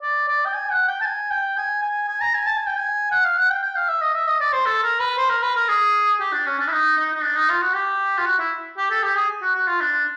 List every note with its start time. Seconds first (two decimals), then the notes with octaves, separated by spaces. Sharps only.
0.02 D5
0.28 D5
0.45 G5
0.54 G#5
0.71 F#5
0.88 G5
1.01 A5
1.05 G#5
1.31 G5
1.57 G#5
1.82 G#5
2.08 G#5
2.21 A#5
2.34 G#5
2.47 A5
2.57 G#5
2.67 G5
2.77 G#5
3.11 F#5
3.24 F5
3.37 F#5
3.50 G5
3.63 G5
3.75 F5
3.89 E5
4.02 D#5
4.15 E5
4.27 D#5
4.40 D5
4.53 C5
4.66 A4
4.83 A#4
5.00 B4
5.17 C5
5.30 A#4
5.43 B4
5.56 A#4
5.69 G#4
6.20 G4
6.33 D4
6.46 C#4
6.59 D4
6.67 E4
6.72 D#4
6.98 D#4
7.14 D#4
7.23 D4
7.36 D#4
7.49 F4
7.62 F#4
7.75 G4
8.18 F4
8.26 F#4
8.39 E4
8.78 G4
8.91 A4
9.03 G4
9.16 G#4
9.42 F#4
9.55 F#4
9.68 F4
9.81 D4